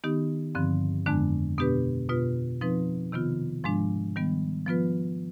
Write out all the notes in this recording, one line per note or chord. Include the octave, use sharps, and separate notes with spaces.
D#3 B3 D#4 G4
G2 D3 F3 C4
F2 D3 G#3 B3 D4
B2 B3 D4 G4 B4
B2 B3 F4 B4
F3 C4 D#4 B4
C3 D#3 B3 F4
G#2 F3 G#3 D4
D#3 G3 B3
F3 B3 F4 B4